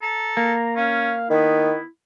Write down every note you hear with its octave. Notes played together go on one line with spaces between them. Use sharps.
A4 A#5
A#3
C#4 F5
D#3 B3 E4